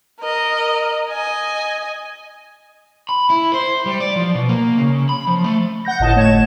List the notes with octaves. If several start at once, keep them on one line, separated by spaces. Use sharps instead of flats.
A#4 D#5
D#5 G#5
B5
E4
C5
G3
D5
F3
B2
A#3
C#3
B5
F3
A3
F#5 G6 A#6
G1 A2 D#5 A5
G1 A3 C#5 G#6 E7